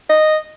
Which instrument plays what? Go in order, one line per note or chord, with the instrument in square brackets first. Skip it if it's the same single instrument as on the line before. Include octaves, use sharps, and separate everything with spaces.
[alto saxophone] D#5